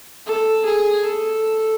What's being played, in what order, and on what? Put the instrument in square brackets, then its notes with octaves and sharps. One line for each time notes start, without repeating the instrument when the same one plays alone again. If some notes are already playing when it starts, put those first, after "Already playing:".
[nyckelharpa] A4
G#4
A4